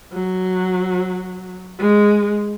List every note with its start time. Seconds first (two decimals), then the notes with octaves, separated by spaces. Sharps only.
0.13 F#3
1.79 G#3